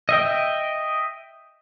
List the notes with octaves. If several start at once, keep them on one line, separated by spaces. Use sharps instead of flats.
D#5 E5 G5